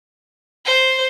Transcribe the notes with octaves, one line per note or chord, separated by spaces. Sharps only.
C5